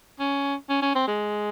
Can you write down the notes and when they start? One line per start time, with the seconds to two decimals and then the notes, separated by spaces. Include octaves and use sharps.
0.20 C#4
0.69 C#4
0.82 C#4
0.95 C4
1.08 G#3